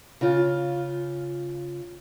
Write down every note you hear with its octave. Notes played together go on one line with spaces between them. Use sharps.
C#3 F4